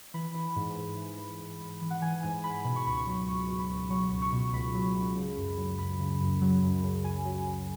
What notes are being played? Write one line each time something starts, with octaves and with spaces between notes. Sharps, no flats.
E3 B5
E3
G#2
G#2
E3
E3
G#2
G#2
E3
F#5
E3 G#5
G#2 G#5
G#2 B5
B2 B5
C#6
C#2 B5
C#6
F#3 B5
C#2 C#6
B2
B5
C#2
F#3 C#6
C#2
C#6
B2
C#2 B5
F#3
C#2
C#3
F#2
F#3
F#2 B5
C#3
F#2
F#3
F#2
C#3
F#2 G#5
F#3
F#2